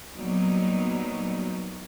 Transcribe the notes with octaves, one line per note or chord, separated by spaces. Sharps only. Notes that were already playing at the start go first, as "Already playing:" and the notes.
A#2 F#3 G3 B3 D#4